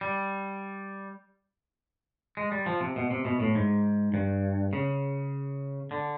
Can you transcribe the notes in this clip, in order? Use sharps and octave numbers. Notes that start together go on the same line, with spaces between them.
G3
G#3
G3
F3
C3
B2
C3
B2
A2
G#2
G2
C#3
D3